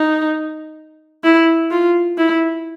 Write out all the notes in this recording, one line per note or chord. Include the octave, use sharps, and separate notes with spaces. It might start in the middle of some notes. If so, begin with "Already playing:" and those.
Already playing: D#4
E4
F4
E4